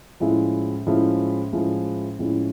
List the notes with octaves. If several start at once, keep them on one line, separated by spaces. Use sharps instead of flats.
A2 F3 G#3 C#4 E4
A2 F3 G#3 C#4 E4
A2 F3 G#3 C#4 E4
A2 F3 G#3 C#4 E4